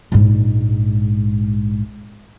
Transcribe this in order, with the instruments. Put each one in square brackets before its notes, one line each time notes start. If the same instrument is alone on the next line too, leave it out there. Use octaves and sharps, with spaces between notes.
[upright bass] A#1 G#2